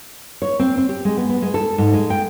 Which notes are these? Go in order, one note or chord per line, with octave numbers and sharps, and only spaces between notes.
C#5
C4
C4
G4
G#3
B3
B3
G#3
A4
G#2
G#3
G5